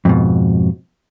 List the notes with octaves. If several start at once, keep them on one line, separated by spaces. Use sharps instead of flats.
F2 G#2 B2